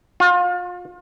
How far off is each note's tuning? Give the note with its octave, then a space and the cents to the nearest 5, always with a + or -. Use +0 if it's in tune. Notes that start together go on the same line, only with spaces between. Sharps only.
F4 +35